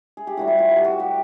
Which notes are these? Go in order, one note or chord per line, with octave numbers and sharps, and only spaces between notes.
G#4
G4
A2 E3 G3 F#4
E4
F4
F#4
G4
F#4
G4